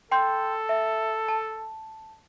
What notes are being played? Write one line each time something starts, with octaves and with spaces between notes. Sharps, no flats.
A4 G5 C6 G6
E5
A5